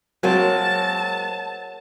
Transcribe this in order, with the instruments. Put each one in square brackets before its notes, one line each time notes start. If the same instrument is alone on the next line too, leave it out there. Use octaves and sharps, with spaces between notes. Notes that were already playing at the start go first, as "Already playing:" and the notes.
[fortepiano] F#3 [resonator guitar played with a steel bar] G#3 A#3 C4 [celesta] A#4 C#5 F#5 [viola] A5